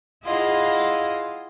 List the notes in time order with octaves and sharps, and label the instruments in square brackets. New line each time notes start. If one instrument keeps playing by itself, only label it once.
[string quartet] E4 F4 G#4 D#5 F5 F#5